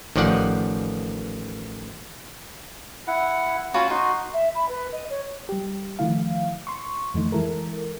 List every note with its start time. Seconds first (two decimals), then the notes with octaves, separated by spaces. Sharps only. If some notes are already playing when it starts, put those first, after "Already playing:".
0.16 A1 D#3 F3 D5 F#5
3.08 E4 F#5
3.74 C#4 F4 F#4 B4 C#5
3.90 D#4 F#4 C6
4.33 E5
4.55 B5
4.68 B4
4.92 D#5
5.10 C#5
5.49 G3 G4
5.99 D3 D#3 F3 A3 E4 F5
6.67 C6 C#6
7.14 F2 D3 E3 A3 D#4
7.32 E3 G#3 E4 A4 A#4